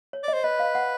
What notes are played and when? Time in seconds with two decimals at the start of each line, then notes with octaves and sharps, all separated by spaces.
0.13 C#5
0.24 D5 D#5
0.34 C5
0.44 B4 D#5
0.59 F5
0.75 F#5